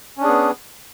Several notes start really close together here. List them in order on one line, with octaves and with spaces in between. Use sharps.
C#4 D4 G#4 B3